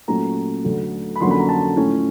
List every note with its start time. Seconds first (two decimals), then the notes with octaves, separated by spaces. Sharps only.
0.08 A#2 F#3 A3 C#4 A#5
0.64 D2 D3 F#3
1.16 B5
1.21 F2 D3 F#3 A#3 C#4 C6
1.30 B5
1.39 A#5
1.49 A5
1.77 A2 F3 A3 C#4